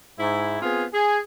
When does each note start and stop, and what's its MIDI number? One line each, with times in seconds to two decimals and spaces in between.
0.18 0.59 44
0.18 0.59 64
0.61 0.84 59
0.61 0.84 60
0.61 0.84 65
0.61 0.84 68
0.93 1.19 68